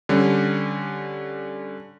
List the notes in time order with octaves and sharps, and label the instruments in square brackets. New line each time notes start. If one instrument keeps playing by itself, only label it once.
[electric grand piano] D3 G3 C#4